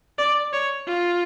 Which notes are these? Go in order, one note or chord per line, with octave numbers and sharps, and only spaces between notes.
D5
C#5
F4